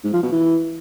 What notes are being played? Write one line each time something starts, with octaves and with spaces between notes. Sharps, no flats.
G#2
F3
B2
E3